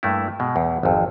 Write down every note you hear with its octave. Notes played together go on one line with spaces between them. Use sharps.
G2 A3 A#3 E4
B2 G#3
E2
G#1 F2